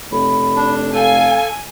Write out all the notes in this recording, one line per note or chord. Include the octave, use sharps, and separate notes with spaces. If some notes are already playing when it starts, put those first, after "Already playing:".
F1 B5
D4
A4 F5 G#5